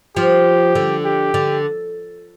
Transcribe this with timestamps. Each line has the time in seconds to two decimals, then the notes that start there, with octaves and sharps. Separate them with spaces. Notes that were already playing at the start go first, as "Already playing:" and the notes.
0.16 F3 G4
0.75 D3
1.05 G4
1.34 D3